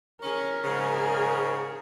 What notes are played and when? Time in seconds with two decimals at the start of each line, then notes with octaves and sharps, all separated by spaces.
0.22 C#4 G#4 A#4
0.64 G#2 C#3